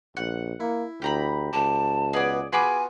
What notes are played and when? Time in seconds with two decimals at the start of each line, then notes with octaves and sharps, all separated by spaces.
0.17 A#1 F#5
0.60 A#3 E4
1.02 D2 G4 A#5 B5
1.53 C#2 D5 A5
2.13 B2 B3 G#4 D5
2.53 B3 F4 F#4 G#4 G#5 B5 D6